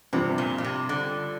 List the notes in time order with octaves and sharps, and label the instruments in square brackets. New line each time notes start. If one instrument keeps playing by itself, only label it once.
[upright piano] G2 F3 C4 [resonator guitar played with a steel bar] C3
[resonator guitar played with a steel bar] A#2
A#2
C3
D3